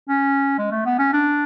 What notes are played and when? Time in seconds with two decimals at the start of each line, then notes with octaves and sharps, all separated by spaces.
0.09 C#4
0.59 G#3
0.72 A3
0.86 B3
0.99 C#4
1.13 D4